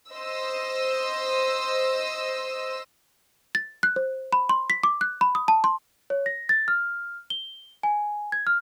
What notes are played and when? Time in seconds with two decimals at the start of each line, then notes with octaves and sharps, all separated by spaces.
0.11 C5 D#5 E6
3.55 A6
3.83 F#6
3.96 C5
4.33 B5
4.49 C6
4.70 B6
4.84 D6
5.01 F#6
5.21 B5
5.35 D#6
5.48 A5
5.64 C6
6.10 C#5
6.26 A#6
6.49 A6
6.68 F6
7.30 G7
7.83 G#5
8.32 G#6
8.47 F6